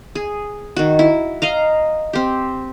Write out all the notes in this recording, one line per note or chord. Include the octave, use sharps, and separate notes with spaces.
G#4
D#3 F#4
E4
D#5 F5 A#5
C4 G4